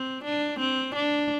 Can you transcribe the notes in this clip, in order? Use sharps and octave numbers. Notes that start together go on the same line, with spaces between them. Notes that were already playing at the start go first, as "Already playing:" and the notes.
Already playing: C4
D4
C4
D4